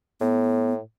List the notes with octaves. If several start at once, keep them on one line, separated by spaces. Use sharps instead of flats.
A2 B3